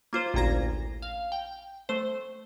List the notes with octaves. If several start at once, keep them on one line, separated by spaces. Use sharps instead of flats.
A#3 F4 C5
A1 D2 A#2 A#5 G#6 A#6
F5
G5
A3 C5